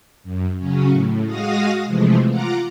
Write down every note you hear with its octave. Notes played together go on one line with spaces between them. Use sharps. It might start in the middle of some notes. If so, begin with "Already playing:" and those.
F#2
C#3 F#3 C#4
A2
G#3 F#4 F5 D#6 A#6
C3 E3 F3 G#3 A3
F4 F#5 A#5 D6